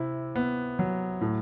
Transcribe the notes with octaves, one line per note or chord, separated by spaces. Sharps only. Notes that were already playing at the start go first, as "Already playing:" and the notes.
Already playing: C3 E4
B3
F#3
A2